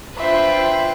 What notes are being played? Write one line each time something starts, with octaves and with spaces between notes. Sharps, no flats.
D4 F4 B4 C5 E5 G5